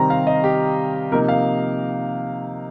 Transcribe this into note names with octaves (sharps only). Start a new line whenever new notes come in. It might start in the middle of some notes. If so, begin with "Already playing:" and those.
Already playing: C3 D#3 G3 C4 A#5
F5
D#5
G4
C3 F3 A#3 D#4 A#4
F5